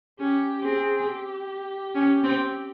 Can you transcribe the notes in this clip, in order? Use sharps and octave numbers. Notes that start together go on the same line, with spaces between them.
C#4 G4
C4 G#4
G4
C#4
C4